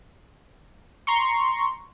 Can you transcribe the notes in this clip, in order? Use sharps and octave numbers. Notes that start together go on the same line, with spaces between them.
A#5 C6 C#6